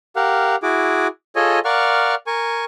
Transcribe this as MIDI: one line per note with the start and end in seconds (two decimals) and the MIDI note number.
0.16 0.56 67
0.16 0.56 70
0.16 0.56 77
0.16 0.56 78
0.63 1.07 64
0.63 1.07 66
0.63 1.07 68
0.63 1.07 86
1.36 1.59 65
1.36 1.59 68
1.36 1.59 69
1.36 1.59 73
1.36 1.59 75
1.36 1.59 80
1.65 2.15 70
1.65 2.15 74
1.65 2.15 77
1.65 2.15 78
1.65 2.15 85
1.65 2.15 89
2.27 2.65 70
2.27 2.65 80
2.27 2.65 85